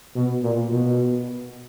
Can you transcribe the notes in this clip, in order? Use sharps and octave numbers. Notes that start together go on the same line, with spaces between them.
B2
A#2
B2